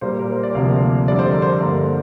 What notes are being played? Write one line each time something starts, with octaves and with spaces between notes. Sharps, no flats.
A#2 G3 A#3 C5
A#4
C5
D5
D2 C3 F3 A#3 F5
F2 D3 G3 D5
C5
A#4
C5
G2 D3 A#3 A#4